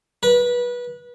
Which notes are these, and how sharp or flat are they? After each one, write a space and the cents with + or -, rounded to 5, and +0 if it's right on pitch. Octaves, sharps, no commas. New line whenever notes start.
B4 -25